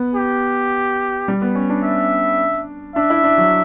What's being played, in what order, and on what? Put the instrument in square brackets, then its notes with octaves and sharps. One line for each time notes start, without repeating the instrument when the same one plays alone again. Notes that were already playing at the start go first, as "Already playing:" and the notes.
Already playing: [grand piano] B3
[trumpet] G4
[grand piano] G3
B3
C#4
D4
[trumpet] E5
[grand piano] D4 [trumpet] E5
[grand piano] E4
D4
F#3